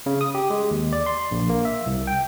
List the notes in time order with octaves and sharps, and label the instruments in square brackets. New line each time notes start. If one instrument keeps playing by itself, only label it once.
[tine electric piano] C#3
D#6
G4
G#3
D#2
D5
C6
A#1
A#3
E5
C2
G5